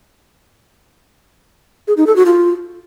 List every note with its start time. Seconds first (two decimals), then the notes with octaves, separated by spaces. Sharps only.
1.88 G#4
1.97 D#4
2.07 A4
2.16 F#4
2.26 F4